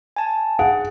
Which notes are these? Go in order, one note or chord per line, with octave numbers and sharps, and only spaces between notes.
G#5 A5
G#4 F#5